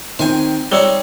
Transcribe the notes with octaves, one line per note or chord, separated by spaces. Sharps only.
D#3 C4 C5 G#5
G3 C4 D#4 C#5 E6 G7